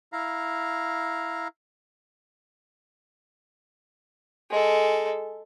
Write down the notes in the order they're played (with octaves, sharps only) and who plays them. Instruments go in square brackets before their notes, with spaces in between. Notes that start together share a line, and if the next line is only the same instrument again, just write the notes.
[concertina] E4 F5 A#5
[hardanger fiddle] G#3 A4